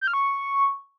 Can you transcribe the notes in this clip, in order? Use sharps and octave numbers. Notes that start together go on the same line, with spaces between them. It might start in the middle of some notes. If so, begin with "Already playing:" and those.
G6
F6
C#6